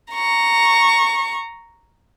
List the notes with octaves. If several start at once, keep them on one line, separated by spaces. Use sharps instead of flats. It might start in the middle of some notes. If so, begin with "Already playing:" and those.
A#5 C#6